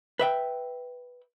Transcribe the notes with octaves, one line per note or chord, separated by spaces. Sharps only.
B4 E5 G5